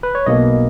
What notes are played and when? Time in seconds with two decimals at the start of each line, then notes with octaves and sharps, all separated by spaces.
0.03 B4
0.15 C#5
0.26 B1 B2 A#3 D#5